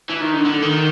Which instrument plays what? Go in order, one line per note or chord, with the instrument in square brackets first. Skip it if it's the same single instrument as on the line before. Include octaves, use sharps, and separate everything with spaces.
[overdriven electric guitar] E3
D#3
D3
D3
D#3